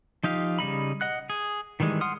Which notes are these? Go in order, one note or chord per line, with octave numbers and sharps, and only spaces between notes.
F3 D#4 G4 F5
C#3 G3 D#4 B5
D#5 F#5 F#6
G#4
D#3 E3 G3 G#3
F#5 C6 D#6 F6